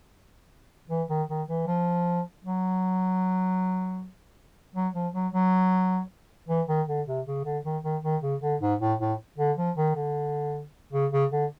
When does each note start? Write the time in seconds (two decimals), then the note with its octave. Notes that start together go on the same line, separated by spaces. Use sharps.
0.89 E3
1.09 D#3
1.29 D#3
1.48 E3
1.67 F3
2.44 F#3
4.75 F#3
4.94 F3
5.14 F#3
5.33 F#3
6.48 E3
6.68 D#3
6.88 D3
7.07 C3
7.27 C#3
7.45 D3
7.64 D#3
7.83 D#3
8.03 D#3
8.22 C#3
8.42 D3
8.61 G#2
8.80 A2
9.00 A2
9.38 D3
9.57 F3
9.77 D#3
9.95 D3
10.93 C#3
11.12 C#3
11.31 D3